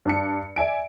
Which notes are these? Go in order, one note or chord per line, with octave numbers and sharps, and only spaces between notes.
G2 D4 C#7
D5 E5 G#5 D7